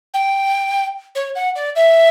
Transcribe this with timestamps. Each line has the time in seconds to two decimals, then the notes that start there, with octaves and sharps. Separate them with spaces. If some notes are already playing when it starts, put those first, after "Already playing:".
0.14 G5
1.15 C#5
1.35 F#5
1.56 D5
1.76 E5